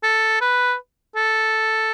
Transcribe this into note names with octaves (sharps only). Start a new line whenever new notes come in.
A4
B4
A4